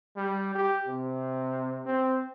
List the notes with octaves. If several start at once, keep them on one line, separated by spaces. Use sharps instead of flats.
G3
G4
C3
C4